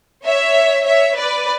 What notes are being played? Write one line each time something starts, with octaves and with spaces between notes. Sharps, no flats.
C#5 E5
C#5 E5
B4 D5